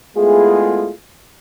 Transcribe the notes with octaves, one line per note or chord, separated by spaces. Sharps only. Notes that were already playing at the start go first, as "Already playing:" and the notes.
G#3 A3 B3 E4 F4 G#4